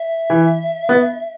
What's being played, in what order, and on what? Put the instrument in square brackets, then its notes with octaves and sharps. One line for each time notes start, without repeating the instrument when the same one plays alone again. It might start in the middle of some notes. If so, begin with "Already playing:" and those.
Already playing: [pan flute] E5
[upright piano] E3
B3